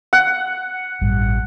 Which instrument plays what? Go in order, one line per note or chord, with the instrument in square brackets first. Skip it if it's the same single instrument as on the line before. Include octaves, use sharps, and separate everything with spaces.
[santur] F#5
[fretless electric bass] A1 G2